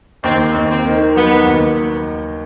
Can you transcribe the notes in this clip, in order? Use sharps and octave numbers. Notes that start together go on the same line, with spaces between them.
D#2 C4
D#2
C4
D#3
F#3 B3
D#2